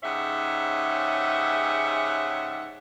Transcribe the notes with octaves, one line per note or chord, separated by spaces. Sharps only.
G#2 C#3 C#4 G4 E5 F#5